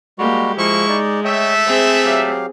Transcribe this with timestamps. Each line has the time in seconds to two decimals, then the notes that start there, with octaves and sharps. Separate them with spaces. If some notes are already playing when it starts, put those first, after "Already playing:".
0.19 G3 G#3 A#3 F#4 G4
0.57 F3 G#3 A#3 E4 C#6
0.89 D#4 D5
1.25 A3 C#5 D#5 E5 G5
1.66 C4 G#4 C5
2.05 F#3 G4 F5